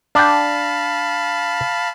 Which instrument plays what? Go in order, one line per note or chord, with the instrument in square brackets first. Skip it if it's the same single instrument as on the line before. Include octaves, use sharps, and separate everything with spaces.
[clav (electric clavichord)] D4 G5 [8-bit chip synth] F5 A5 B5